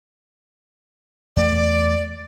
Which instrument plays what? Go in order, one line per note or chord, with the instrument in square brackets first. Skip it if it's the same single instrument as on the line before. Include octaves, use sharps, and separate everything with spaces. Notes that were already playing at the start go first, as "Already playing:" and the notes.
[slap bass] E2 A3 [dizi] D5